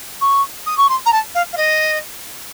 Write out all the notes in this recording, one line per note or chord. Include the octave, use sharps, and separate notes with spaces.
C#6
D#6
C#6
C6
A#5
A5
F5
F5
D#5